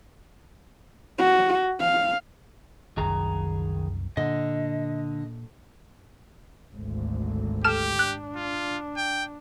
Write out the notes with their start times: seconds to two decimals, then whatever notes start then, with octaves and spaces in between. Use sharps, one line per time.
1.18 F#4
1.80 F5
2.97 F#1 C2 F#2 D#3 G#4 A#5
4.17 A#2 D3 D#5
6.75 G#1 D2
7.64 G4 A4 F6 E7
7.99 D4 F#6
8.36 F4
8.97 G5